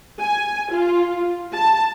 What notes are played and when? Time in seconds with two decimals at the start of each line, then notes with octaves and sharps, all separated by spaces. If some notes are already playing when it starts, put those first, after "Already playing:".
0.20 G#5
0.71 F4
1.55 A5